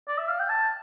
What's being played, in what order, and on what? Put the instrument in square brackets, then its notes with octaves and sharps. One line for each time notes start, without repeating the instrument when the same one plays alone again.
[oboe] D5
E5
F5
G5
A5